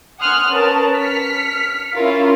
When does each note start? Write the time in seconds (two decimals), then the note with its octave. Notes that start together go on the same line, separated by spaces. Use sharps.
0.20 F#5 G#5 C6 D#6 F6 F#6
0.50 C#4 A#4 B4 A5
0.97 F6 B6 C#7
1.95 C#4 E4 F4 A#4